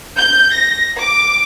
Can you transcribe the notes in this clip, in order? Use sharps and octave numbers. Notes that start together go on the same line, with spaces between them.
G6
A#6
D6